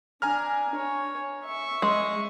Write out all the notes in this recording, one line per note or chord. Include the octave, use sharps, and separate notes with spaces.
D4 G#5 A#5 F6
C#5
E5 C#6
G#3